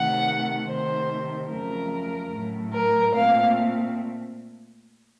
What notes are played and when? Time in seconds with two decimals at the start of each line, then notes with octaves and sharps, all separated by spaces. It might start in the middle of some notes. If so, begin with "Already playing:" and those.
Already playing: C3 D#3 A3 F#5
0.68 C3 D#3 A3 C5
1.50 F2 C#3 F#3 A3 A#4
2.32 A2 F#3 A3
2.74 A#4
3.14 A#2 A3 C4 F5